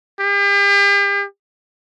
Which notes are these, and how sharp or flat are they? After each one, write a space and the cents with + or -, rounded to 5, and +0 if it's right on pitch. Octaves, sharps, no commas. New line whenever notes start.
G4 +40